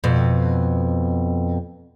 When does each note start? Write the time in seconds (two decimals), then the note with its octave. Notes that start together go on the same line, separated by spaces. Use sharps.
0.04 F2 B2